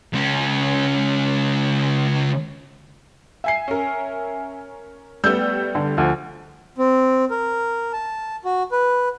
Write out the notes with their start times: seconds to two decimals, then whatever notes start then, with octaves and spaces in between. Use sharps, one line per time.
0.13 C#2 C#4
3.44 E5 G#5 C7
3.68 C#4 A#4
5.24 G3 A3 B3 E6 G6
5.75 D3
5.97 D2 F3
6.78 C4
7.30 A#4
7.93 A5
8.45 F#4
8.72 B4